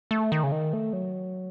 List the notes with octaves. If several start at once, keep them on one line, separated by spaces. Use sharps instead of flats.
A3
D#3
C#3
D#3
A3
F#3